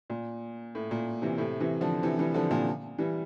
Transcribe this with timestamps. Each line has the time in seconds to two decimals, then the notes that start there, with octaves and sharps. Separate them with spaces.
0.10 A#2
0.75 A2
0.91 A#2
1.22 C3 E3
1.38 A2 C3
1.60 C3 E3
1.81 D3 F3
2.03 C3 E3
2.19 E3 G3
2.34 D3 F3
2.51 A#2 D3
2.98 E3 G3